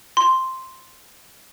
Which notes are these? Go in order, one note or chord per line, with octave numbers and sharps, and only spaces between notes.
C6